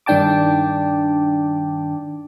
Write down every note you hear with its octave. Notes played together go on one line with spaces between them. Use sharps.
G2 D#3 D4 G5 A5 D6